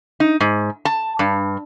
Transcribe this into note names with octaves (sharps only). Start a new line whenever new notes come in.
D#4
G#2
A5
G2